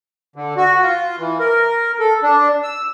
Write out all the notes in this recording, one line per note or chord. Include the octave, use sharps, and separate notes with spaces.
D3
F#4
F4
E3
A#4
A4
D4
E6